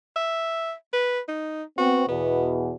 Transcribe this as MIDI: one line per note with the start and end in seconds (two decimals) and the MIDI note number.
0.16 0.74 76
0.93 1.20 71
1.28 1.63 63
1.78 2.02 59
1.78 2.02 60
1.78 2.06 66
2.08 2.74 40
2.08 2.74 47
2.08 2.54 59